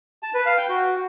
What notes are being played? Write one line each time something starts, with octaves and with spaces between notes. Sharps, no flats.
A5
B4
F5
G5
F#4